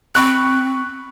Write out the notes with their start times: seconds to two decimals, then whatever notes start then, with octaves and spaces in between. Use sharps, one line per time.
0.15 C4 B5 C#6 F#6